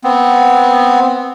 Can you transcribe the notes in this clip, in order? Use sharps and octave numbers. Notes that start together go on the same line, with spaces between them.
B3 C4